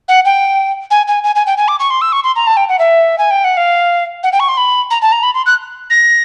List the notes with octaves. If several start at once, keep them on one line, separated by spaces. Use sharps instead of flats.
F#5
G5
G#5
G#5
G#5
G#5
G5
G#5
D6
C#6
C6
E6
C#6
C6
A#5
A5
G5
F#5
E5
G#5
G5
F#5
F5
F#5
G5
C#6
C6
B5
A#5
A5
A#5
B5
C6
F#6
A#6